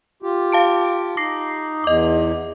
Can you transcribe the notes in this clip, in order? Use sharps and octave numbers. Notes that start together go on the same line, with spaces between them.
F4 G4
F5 A5 D7
D#4 D6 A#6 C7
E2 D#5 D6